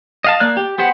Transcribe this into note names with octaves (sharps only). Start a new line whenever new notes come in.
D#5 F5 A5
A#3 D5 F#6
G4
B3 G4 C5 F#5